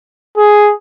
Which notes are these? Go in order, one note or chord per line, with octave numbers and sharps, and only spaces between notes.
G#4